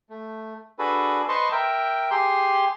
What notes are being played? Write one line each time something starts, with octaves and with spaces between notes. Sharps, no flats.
A3
D4 F#4 G#4 A4 B4
B4 C5 D#5 A5 C6 C#6
A#4 E5 G5
G4 G#4 C6